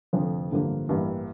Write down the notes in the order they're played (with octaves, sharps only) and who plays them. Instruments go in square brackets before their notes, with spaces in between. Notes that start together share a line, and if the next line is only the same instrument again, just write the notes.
[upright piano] F1 F2 D3 F3
A1 G2 D3 F3 A#3
A1 G2 E3 A#3 E4